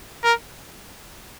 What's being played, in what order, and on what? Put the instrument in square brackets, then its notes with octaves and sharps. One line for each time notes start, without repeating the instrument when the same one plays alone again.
[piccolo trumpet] A#4